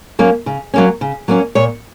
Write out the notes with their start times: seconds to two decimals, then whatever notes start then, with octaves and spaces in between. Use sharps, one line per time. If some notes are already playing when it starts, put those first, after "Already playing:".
0.19 F#3 A#3 C#4
0.46 C#3
0.74 F#3 A#3 C#4
1.01 C#3
1.28 F#3 A#3 C#4
1.55 A#2 C#5